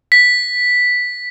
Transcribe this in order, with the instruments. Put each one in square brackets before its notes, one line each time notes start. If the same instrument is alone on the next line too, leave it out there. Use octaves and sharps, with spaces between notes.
[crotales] B6